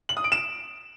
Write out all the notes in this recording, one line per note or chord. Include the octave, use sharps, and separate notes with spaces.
F#7
D#6
D7
E7